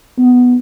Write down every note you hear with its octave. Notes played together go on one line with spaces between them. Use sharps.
B3